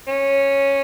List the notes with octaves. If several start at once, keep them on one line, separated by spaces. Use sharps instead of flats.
C#4